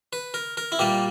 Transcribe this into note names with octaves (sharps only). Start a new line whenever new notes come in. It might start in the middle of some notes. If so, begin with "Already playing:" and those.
B4
A#4
A#4
E4
A#2 G3 A#3 G4